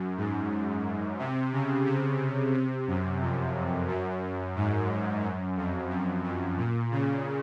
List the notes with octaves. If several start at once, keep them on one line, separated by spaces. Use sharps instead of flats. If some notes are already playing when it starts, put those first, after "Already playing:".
Already playing: F#2
G#2
C3
C#3
C3
C3
F#2
F2
F#2
G#2
F#2
F2
F#2
F#2
A#2
C#3